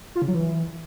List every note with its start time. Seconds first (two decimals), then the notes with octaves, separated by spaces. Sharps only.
0.15 F4
0.22 C#3
0.28 F#3
0.34 E3